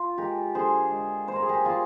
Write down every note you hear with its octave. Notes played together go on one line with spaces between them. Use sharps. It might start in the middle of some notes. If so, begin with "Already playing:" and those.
Already playing: F4
G#3 G4 A#4
D3 G#4 C5
G#3
G3 C5
A#4
G#4
G4 A#4
G3 F4 G#4